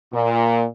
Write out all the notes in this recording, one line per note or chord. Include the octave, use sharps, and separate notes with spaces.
A#2